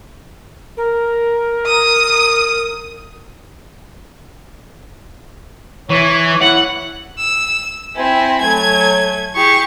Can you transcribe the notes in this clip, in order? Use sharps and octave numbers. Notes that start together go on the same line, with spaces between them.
A#4
D#6
E3 C#5
E4 F#5
E6
C4 E4 G#5
F#3 A3 G#5 G#6
E4 G4 G#4 C#6